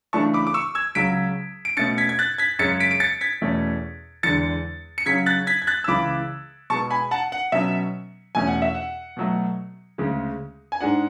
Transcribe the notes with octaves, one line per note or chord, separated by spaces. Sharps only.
C#3 E3 A3 D4 A5 C#6
B5 D6
D6
C#6 E6
E6 G#6
C#2 C#3 F#3 C#4 B6 D7
D7
B2 A3 C#4 A6 C#7
G#6 B6
G#6
F#6 A6
G#6 B6
F#2 C#3 G#3 C#4 A6 C#7
B6 D7
D7
A6 C#7
G#6 B6
E2 B2 A3 C#4
E2 D3 G#3 A6 C#7
C#7
C#3 F#3 C#4 G#6 B6
F#6 A6
G#6 B6
G#6
F#6 A6
E6
C#2 C#3 E3 B5 D6
B2 G#3 B3 A5 C#6
G#5 B5
F#5 A5
F#5
B2 F#3 C#4 E5
E2 B2 A3 C#4 G#5
F#5
E5
F#5
B2 F#3 A3
D2 C#3 G#3 C#4
G#5
G#2 G#3 D4 F#5